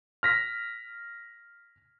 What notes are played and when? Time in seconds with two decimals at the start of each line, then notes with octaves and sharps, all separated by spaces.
0.23 F6 A#6 B6